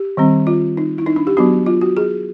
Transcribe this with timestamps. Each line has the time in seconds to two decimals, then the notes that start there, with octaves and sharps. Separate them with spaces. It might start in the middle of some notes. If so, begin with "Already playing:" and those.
Already playing: G4
0.17 D#3 G3 C4
0.47 F4
0.77 D#4
0.98 E4
1.06 D#4
1.16 D4
1.27 G4
1.37 F#3 B3 D4 F#4
1.66 F4
1.81 F#4
1.97 G#4